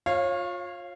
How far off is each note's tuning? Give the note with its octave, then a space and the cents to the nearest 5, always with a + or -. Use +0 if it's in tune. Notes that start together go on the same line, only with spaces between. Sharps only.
F4 +25 C#5 -25 F5 -10